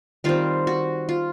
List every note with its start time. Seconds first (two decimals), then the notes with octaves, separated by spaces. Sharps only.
0.24 D#3 G3 C4 F4
0.67 F#4
1.09 F4